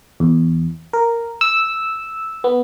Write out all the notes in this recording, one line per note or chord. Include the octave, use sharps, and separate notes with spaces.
E2
A#4
E6
B3